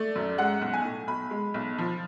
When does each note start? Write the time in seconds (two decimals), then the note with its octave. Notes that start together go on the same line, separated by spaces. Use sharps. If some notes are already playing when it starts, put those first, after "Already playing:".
Already playing: A3 D5
0.15 F#2
0.38 G#3 F#5
0.61 B1
0.73 G#5
0.84 A2
1.07 B1 B5
1.31 G#3
1.54 B1
1.78 F3